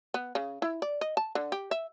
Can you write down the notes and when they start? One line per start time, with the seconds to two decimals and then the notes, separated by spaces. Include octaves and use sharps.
0.14 B3
0.35 C#3
0.62 E4
0.82 D5
1.01 D#5
1.17 A5
1.35 D3
1.52 G4
1.71 E5